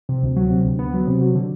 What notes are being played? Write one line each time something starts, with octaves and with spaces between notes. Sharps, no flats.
C3
D2
F#3
C3
D2
B3
F#3
C3
F#3
D3